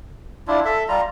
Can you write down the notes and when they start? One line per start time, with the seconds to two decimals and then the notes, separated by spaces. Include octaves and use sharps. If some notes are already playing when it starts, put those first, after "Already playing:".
0.48 D4 E4 F4
0.65 A4 E5
0.88 G3 F4 A#5